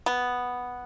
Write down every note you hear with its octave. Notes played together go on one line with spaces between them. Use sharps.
B3